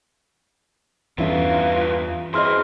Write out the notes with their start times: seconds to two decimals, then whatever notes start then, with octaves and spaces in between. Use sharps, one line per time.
1.18 E2 G2 B3 C#4 E4 F4 A4
2.34 C4 E4 G#4 B4 D#5 C6 F6